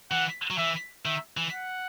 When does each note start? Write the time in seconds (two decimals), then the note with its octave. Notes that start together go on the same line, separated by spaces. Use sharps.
0.11 E3 F#5
0.51 F#3
0.58 E3 E5
1.05 D#3 E5
1.37 E3
1.53 F#5